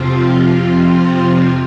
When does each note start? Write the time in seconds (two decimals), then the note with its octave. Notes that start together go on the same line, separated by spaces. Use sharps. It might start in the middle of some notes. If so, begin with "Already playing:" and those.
Already playing: F2 C3 F3 C4 F4
0.95 C6